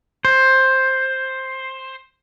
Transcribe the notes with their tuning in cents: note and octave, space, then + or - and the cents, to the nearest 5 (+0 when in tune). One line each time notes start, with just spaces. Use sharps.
C5 +10